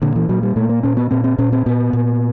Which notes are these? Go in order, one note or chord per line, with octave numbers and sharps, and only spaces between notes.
A#2 D3
E3
A#2 F#3
G3
A#2 A3
A#3
A#2 C#4
B3
A#2 C4
C4
A#2 C#4
C4
A#2 B3
A#2